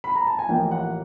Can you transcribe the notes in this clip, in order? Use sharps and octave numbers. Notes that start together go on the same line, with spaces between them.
B5
A#5
A5
G#5
A1 A2 F3 A#3 G5
F#5